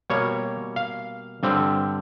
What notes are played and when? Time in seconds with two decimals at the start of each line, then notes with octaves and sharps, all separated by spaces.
0.10 B2 G3 A#3 C#5
0.76 F5
1.43 G2 D3 G3 C4